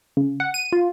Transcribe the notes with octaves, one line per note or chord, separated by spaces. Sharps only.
C#3
F#5
D#7
F4